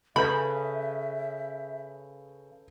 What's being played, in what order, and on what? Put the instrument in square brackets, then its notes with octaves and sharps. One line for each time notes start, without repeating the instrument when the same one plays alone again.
[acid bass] C#3 [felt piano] A4 B4 G6 [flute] E5 [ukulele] B5